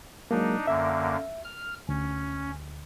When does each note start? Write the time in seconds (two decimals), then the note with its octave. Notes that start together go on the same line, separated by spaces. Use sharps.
0.31 F#3 G#3 A#3 D4 D#4
0.67 F#2 D3 A#3 E5
1.44 F6
1.89 D2 C#4